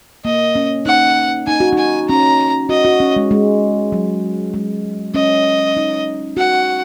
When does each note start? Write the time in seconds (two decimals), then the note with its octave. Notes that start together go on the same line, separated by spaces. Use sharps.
0.25 A#3 D#5
0.55 C#4
0.86 D#4 F#5
1.47 D#4 G#5
1.60 F#4
1.73 D#4
1.78 G#5
2.09 C#4 A#5
2.69 F#4 D#5
2.85 F#4
3.00 C#4
3.16 G#3
3.31 G#3
3.92 F#3
4.54 G#3
5.14 C#4 D#5
5.77 D#4
6.37 F#4 F#5